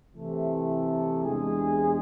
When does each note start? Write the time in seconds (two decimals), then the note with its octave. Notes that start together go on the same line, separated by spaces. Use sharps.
0.14 C3 E3 A3
1.24 E2 C3 G#3 D4 G#4